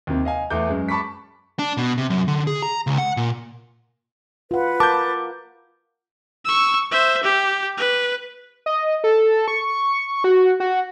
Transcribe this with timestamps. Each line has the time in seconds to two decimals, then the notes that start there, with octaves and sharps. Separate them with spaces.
0.07 D#2 C3
0.25 D#5 F5 G#5
0.50 E2 A3 D6 G6
0.69 F#2 G#3
0.89 A5 B5 C#6 D6 B6
1.59 D4
1.77 B2
1.98 C3
2.10 F#2
2.28 D3
2.47 G#4
2.62 A#5
2.87 C#2
2.98 F#5
3.17 A#2
4.51 F4 B4 F#5
4.80 A#4 A5 D6 G6
6.45 C#6 E6
6.91 C5 E5
7.23 G4
7.77 B4
8.66 D#5
9.04 A4
9.48 C#6
10.24 F#4
10.60 F#4